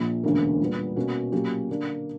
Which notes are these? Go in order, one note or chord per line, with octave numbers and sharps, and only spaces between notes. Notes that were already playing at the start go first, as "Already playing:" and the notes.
Already playing: A#1 A#2
E1 D2 D3 A#3 C#4
A#2 G3 B3
B2 A#3 C#4 F#4
A#2 F#3 A#3 C#4 G4
D3 A#3 D4